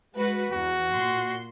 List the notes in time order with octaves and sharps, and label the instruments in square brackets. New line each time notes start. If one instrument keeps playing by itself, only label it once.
[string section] G#3 F#4 B4
[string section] E2 [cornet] F#4
[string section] A#2 C6